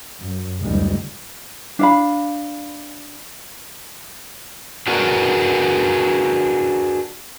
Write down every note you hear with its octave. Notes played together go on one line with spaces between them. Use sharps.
F#2
F#1 D2 G3 G#3
D4 F5 B5
D4 F#4 G#4 A#4 B4